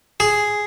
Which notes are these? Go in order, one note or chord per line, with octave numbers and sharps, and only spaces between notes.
G#4